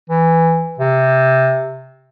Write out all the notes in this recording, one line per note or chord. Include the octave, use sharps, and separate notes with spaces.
E3
C3